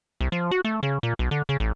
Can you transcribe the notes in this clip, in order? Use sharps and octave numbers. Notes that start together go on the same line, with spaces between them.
C2
F3
F#4
A3
C#3
A#2
B1
D3
C#3
A1